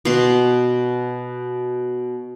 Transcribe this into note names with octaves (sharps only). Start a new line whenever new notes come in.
B2 C6